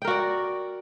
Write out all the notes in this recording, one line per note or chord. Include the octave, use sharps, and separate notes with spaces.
F#4 A#4 D5 G5